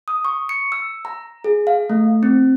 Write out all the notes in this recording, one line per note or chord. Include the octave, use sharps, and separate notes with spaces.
D#6
C#6
C#7
E6
A#5
G#4
F5
A3
C4